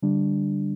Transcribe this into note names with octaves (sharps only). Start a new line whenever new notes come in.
D3 G3 D4